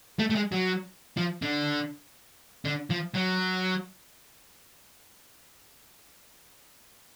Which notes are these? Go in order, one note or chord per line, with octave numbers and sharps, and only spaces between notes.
A3
A3
G#3
F#3
F3
D3
D3
F3
F#3